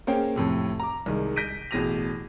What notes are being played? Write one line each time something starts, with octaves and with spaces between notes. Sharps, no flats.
A#3 C#4 G#4 C5 C#5 G5
F2 A2 C3
A#5 D6
C2 D#3 G#3
G6 A#6 B6 D7 D#7
A1 B2 G#4 A#6 D#7 F7